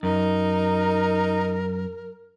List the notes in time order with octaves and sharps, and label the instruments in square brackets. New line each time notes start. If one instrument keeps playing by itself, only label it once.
[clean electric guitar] F#2 [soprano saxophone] D#4 [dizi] A#4